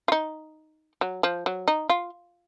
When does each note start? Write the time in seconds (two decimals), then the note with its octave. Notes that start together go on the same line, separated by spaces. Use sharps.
0.08 F4
0.12 D#4
1.01 F#3
1.23 F3
1.46 F#3
1.68 D#4
1.90 F4